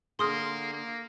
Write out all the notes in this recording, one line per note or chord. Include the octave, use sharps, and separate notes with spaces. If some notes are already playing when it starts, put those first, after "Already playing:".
D3 A#3 G#4 C6 D#6 F6
A#3